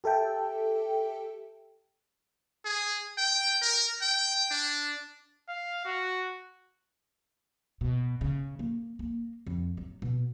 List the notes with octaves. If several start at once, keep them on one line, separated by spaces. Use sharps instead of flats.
G4 A4 E5 G5 A5
G#4
G5
A#4
G5
D4
F5
F#4
B2
C#3
A#3
A#3
F2
F#3
B2